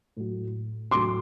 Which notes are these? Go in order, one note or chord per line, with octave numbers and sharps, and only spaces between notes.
A2 F#3
A2 F#3 C6 D6